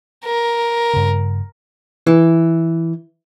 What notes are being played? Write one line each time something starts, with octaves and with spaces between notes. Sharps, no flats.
A#4
G2 C#3
E3